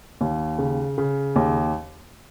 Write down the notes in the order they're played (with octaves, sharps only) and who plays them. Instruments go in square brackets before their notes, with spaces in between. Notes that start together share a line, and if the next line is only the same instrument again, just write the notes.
[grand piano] D#2
C#3
C#3
D#2